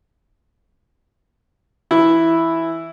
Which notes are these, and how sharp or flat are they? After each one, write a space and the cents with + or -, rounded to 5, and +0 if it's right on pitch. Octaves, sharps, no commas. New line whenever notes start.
E3 +0 E4 +0